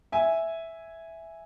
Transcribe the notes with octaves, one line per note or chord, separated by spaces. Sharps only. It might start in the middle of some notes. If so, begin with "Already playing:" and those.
E5 G#5